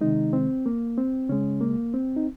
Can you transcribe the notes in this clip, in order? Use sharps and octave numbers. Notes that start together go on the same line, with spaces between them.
C3 D#3 G#3 D#4
C4
A#3
C4
C#3 G#3 C#4
A#3
C4
D#4